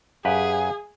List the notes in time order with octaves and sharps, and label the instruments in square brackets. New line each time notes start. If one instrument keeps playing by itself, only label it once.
[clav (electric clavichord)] F#2 G4 B4 [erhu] G#4 [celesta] F5 G#5